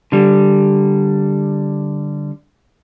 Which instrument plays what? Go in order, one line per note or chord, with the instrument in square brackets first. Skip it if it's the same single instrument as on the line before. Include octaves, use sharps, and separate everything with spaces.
[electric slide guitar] D3 G3